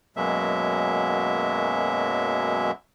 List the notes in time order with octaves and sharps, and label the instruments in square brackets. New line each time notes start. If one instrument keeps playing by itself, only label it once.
[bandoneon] F#2 B2 F#3 G#3 A#3 E5